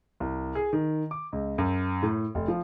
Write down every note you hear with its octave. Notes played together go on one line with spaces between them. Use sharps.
C2
G#4
D#3
D6
C#2
F#2
A2
F1
F3